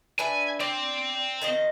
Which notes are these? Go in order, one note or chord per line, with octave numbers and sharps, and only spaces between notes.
D4 B4 E5 G#5
C4 D5
D#3 F3 D#5